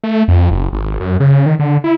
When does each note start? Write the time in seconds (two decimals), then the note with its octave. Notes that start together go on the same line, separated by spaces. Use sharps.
0.04 A3
0.28 F2
0.51 F#1
0.73 G#1
1.00 F#2
1.20 C#3
1.46 D#3
1.59 D3
1.84 E4